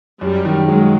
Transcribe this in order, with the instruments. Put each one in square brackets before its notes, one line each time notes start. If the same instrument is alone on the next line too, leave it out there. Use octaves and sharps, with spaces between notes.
[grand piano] F#2 [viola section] G3
[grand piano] D#3
[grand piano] F#3 [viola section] G#3